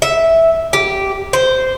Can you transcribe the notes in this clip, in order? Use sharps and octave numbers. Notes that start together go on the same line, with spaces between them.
E5
G4
C5